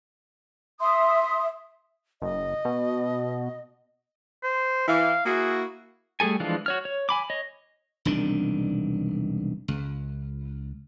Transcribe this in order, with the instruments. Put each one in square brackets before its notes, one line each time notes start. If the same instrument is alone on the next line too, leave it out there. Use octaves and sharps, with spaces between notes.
[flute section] E5 C6 D#6
[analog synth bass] F#1 [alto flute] D#5
[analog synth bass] B2
[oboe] C5
[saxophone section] E3 [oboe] F5
[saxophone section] A#3 E4 F#4 [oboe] G#4
[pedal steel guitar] G3 A3 G#4 A4 G#5
E3 F3 G#3 D4 F4
F#4 C#5 F6
C#5
G#5 B5 D6
C#5 D#5
[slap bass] E1 C2 D#3 D4
C#2